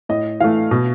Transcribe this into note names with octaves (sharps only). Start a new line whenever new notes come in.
A2 D#5
E3 A3 F5
B2